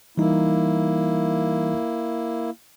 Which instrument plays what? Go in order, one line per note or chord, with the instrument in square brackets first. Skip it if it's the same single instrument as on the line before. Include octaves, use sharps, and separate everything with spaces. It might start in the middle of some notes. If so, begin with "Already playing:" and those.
[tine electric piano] E3 G3 D#4 [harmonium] A#3 E4